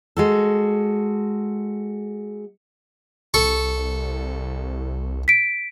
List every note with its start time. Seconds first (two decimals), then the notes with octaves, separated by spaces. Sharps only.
0.17 G#3 F#4 A4
3.34 C2 A4 C#6
5.28 B6 D7